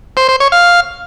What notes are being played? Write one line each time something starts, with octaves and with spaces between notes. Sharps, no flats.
C5
C5
C#5
F5